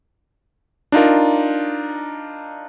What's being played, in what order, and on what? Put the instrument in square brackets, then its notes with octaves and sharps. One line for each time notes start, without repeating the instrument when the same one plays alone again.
[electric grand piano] D4 D#4 F4 A#4